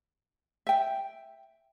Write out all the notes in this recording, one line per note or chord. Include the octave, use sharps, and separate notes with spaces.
E5 G5